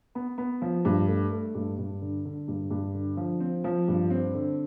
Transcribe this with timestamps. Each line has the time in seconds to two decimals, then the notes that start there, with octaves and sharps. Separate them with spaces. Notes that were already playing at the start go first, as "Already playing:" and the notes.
0.15 B3
0.38 B3
0.62 F3
0.85 G2
1.08 A3
1.31 A3
1.55 G2
1.78 G2
2.01 D3
2.25 D3
2.48 G2
2.70 G2
2.94 D3
3.17 F3
3.40 C4
3.64 F3
3.88 G2
4.10 C4
4.34 D3